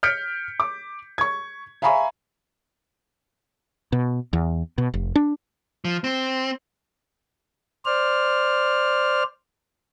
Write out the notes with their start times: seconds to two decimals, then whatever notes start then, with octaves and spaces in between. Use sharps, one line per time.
0.03 F6 G6 B6 C#7 D7
0.60 D6
1.18 C#6 G#6
1.82 E5 F5 G#5 A#5 B5 C#6
3.92 B2
4.33 E2
4.78 B2
4.94 F1
5.16 D4
5.85 F3
6.04 C4
7.86 C5 D5 F6